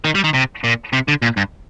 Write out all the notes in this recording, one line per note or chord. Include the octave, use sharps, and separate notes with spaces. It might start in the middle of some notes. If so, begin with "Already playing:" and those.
D#3
G3
D#3
C3
A#2
C3
D3
A#2
G2